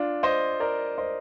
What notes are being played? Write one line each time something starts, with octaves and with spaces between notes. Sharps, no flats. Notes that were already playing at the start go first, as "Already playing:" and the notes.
Already playing: D4 F4
C5 D#5
A#4 D5
C5 D#5